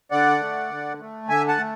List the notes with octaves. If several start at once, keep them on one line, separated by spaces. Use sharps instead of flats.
D3 D5 F#5
A3
D3
A3
D3 E5 G#5
F#5 A5
A3